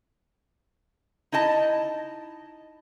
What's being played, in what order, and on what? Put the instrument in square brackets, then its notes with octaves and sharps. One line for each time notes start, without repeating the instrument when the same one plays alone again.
[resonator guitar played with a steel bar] D#4 E4 D#5 A5